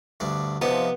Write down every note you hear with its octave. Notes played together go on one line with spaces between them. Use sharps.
D2 G2 D4
C3 F3 B3 D#4 A5